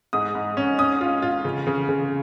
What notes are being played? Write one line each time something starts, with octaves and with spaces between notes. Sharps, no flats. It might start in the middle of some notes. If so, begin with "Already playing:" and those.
G#2 D#6
G#2
C#4
C#4 D#6
F4
F4
C#3
C#3
C#3